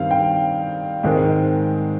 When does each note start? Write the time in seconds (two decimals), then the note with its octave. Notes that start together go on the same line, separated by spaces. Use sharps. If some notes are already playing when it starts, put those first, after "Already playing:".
Already playing: G2 D#3 G3 C4 F5
0.11 G5
1.03 G#2 D#3 G#3 C4